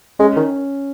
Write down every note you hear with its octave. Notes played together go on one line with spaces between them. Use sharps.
G#3 C#4
D#3